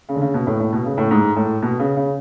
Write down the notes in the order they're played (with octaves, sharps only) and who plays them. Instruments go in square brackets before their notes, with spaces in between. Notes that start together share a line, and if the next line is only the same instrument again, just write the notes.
[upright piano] C#3
D3
C#3
B2
A2
A2
B2
C#3
A2
G#2
A2
B2
C#3
C#3